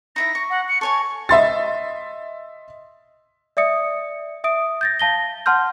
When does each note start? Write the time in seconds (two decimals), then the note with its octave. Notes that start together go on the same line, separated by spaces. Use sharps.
0.16 D#4 E4 E5 A#6
0.35 C#6
0.50 F#5
0.68 C#7
0.81 A4 C#5 G#5 C#6
1.29 D#5 E5 C6 A6
3.57 D5 E5 D#6 C#7
4.44 E5 D#6 D7
4.81 G6 A6 A#6
4.99 F5 A5 A#6 G7
5.46 F#5 A5 C6 F6 G6